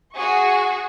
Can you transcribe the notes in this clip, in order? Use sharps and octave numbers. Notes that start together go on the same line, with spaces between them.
F#4 G#4 C#6